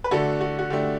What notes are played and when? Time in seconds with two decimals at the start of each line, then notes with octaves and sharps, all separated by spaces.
0.04 B4
0.11 D3 A3 D4 F#4 A4
0.41 F#4
0.59 F#4
0.70 D3 A3 D4 G4